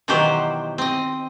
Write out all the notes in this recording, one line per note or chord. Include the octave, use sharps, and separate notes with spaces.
B2 D#3 E3 F#3 G4 C5
C4 D#5